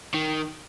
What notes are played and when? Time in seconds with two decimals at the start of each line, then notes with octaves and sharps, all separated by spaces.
0.14 D#3